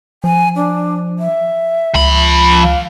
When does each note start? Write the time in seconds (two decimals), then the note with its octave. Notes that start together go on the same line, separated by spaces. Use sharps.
0.24 F3 G#5
0.56 D4
1.19 E5
1.95 C#2 F3 B5
2.62 F5